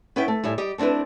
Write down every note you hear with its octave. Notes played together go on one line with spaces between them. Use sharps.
B3 C#4 E4 B4 E5 G5
A3
A2 G3 E5 G#5
G3 G4 D#5
A3 C4 D4 E4 B4